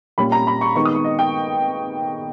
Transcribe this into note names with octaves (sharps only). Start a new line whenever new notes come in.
A#2 G3 C#4 B5
A#5
B5
C#6
D#3 G#3 B3 D#4 C#6
D#6
C#6
D#5
G5